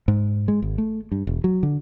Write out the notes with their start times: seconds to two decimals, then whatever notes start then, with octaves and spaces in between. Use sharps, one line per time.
0.08 G#2
0.48 G#3
0.62 G#1
0.78 A3
1.12 G2
1.27 E1
1.44 F#3
1.63 D3